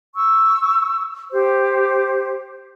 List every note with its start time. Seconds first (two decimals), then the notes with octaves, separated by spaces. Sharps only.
0.16 C#6 E6
1.32 G4 C5